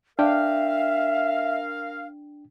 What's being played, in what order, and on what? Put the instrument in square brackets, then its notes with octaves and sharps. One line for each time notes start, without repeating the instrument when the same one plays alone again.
[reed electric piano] D4 G5 [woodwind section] A#4 F5 [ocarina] E5